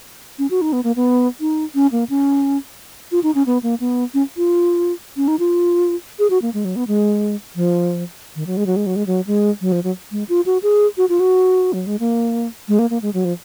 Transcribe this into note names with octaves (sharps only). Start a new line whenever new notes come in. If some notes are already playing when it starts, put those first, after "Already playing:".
C#4
F#4
D#4
B3
A#3
B3
D#4
C#4
A#3
C#4
F4
D#4
C#4
B3
A#3
B3
C#4
F4
C#4
D#4
F4
G#4
F#4
A#3
G#3
F#3
B3
G#3
F3
D#3
F#3
G#3
F#3
G#3
F#3
G#3
F#3
G#3
F#3
F3
F#3
G#3
F4
F#4
G#4
F#4
F4
F#4
F#3
G#3
A#3
G#3
A#3
A#3
G#3
F#3
F3